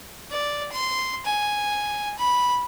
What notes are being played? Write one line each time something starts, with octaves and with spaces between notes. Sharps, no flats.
D5
C6
G#5
B5